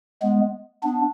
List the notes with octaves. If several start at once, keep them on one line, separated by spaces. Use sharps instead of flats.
G#3 B3
B3 D4